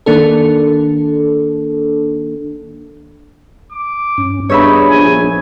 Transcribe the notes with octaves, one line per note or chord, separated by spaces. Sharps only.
D#3 A#3 D4 A4
D6
G2 C#4
G2 B3 D4 D#4 G#4 C#5 E5 B5
A#1 G#5